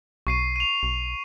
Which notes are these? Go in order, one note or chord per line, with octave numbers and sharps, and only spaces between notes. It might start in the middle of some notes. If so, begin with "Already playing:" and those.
B1 C#6 C7 D#7
D#7 F7
B1